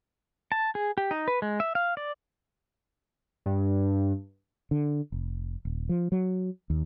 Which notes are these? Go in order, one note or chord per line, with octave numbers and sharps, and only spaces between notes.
A5
G#4
G4
D#4
B4
G#3
E5
F5
D5
G2
D3
F1
D#1
F3
F#3
D#2